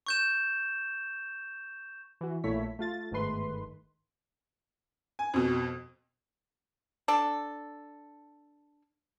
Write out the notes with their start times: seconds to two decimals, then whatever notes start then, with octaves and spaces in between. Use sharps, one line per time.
0.06 C#6 G6 E7
2.21 E3 F#4
2.44 A#1 A#2 A3 E4 C#5 B6
2.79 A3 F4 A6
3.11 G1 G#2 D#3 A3 B4 C6
5.19 G#5
5.34 F2 B2
7.08 D4 A4